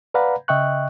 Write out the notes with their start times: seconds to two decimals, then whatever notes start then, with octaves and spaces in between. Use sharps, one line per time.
0.14 B4 D5 F5 F#5 A#5 B5
0.48 C#3 D#5 E5 G5 C#6 F#6